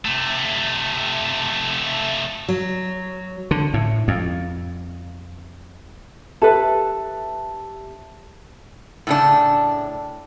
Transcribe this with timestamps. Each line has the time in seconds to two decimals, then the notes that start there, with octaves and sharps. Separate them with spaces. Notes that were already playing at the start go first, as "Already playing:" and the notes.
0.05 C3 A3
2.48 F#3
3.51 D3
3.74 A2
4.08 F2
6.42 G4 A4 B4 E5 A5
9.07 A2 C#3 D4